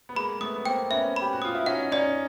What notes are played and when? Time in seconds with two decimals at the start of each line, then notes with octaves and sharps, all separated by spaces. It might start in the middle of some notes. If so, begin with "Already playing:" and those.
0.09 B3
0.15 G#3 A#3 B5
0.41 A3 B3 D#6
0.56 B3
0.66 A#3 C4 G5
0.91 B3 C#4 E5
1.16 G4 B5
1.33 F#4
1.42 F4 D#6
1.55 E4
1.66 C#4 D#4 F#5
1.92 C#4 D#4 D5